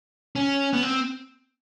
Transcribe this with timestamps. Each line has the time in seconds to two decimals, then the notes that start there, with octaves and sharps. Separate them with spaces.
0.36 C#4
0.73 B3
0.83 C4